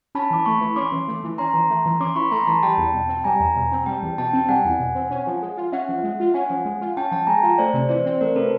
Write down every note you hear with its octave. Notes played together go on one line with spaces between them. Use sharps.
C#4 A5 B5
E3 D6
A3 B5 C#6
E3
C#4 C6 D6
E3
A3
E3
C#4 A#5 C6
E3
A3
E3
C#4 C6 D6
E3 B5 C#6
A3 A#5 C6
E3 A5 B5
G3 G5 A5
E2
B2
C4
G3 G#5 A#5
E2
B2
C4
G3 G5 A5
E2
B2 G5 A5
C4
G3 F#5 G#5
E2
B2
C4
C#4
F3
G#3
F4
C#4 E5 F#5
F3
G#3
F4
C#4 F#5 G#5
F3
G#3
F4
C#4 G5 A5
F3 G5 A5
G#3 G#5 A#5
F4
A3 C5 D5
C3
E3 C5 D5
C4
A3 A#4 C5
C3 A4 B4